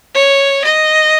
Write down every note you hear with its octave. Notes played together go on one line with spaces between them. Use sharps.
C#5
D#5